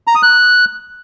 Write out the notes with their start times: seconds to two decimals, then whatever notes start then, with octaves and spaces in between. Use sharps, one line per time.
0.07 A#5
0.15 D#6
0.23 F#6